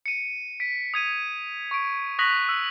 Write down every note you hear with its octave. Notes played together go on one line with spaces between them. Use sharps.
C#7 D#7
B6 D7
D#6 G#6 D#7
C#6 D7
C#6 D#6 F#6 A#6 B6 F#7
E6